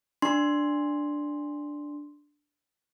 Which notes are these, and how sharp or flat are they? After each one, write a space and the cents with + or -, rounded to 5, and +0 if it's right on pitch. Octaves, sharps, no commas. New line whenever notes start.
D4 +0 C6 +0